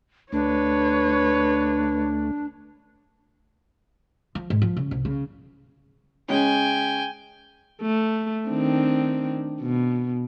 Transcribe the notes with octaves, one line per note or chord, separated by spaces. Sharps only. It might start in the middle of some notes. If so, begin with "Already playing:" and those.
D2 A3 D4 B4 C#5
F3
G#2
F3
C#3
C2
C#3
C#3 G#3 C#4 G5 G#5
A3
D#3 C4 D4
B2